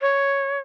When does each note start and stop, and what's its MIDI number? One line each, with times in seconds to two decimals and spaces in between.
0.01 0.59 73